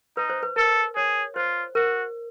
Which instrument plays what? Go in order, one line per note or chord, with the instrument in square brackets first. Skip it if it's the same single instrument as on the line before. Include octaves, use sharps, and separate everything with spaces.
[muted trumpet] D#4 [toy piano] B4
[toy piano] C5
B4
[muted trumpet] A4 [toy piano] A#4
[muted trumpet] G#4 [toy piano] C#5
[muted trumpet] F4 [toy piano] C5
[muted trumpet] F#4 [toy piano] A#4